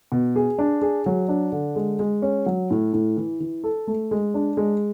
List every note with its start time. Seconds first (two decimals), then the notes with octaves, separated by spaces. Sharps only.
0.12 B2
0.36 G#4
0.59 D4
0.82 G#4
1.06 F#3
1.28 D4
1.52 D3
1.76 G#3
1.99 G#3
2.22 C#4
2.46 F#3
2.71 A2
2.93 A2
3.17 E3
3.40 E3
3.64 A4
3.87 A3
4.11 G#3
4.34 D4
4.57 G#3